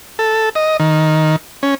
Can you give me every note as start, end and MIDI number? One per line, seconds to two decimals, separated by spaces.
0.19 0.49 69
0.55 0.77 75
0.80 1.36 51
1.63 1.75 61